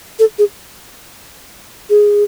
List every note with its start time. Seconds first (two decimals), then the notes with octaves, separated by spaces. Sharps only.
0.19 A4
0.39 G#4
1.90 G#4